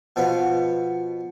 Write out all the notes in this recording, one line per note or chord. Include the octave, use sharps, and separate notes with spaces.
B2 F3 B3